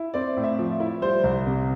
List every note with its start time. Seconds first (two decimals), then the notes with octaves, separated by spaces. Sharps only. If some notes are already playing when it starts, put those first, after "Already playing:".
Already playing: E4
0.14 C4 D5
0.37 A2
0.43 E5
0.59 F3
0.80 E4
1.02 G3 C5
1.24 C2
1.47 C3